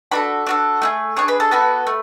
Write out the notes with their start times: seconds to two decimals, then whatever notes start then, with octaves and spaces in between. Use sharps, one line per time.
0.11 D4 F#4 A4 B4 B5
0.47 D4 F#4 A4
0.82 A3 E4 G#4
1.16 D4 G#4 C#5 C#6
1.28 B4 B5
1.40 A4 A5
1.51 B3 F#4 A4 B4 B5
1.87 A3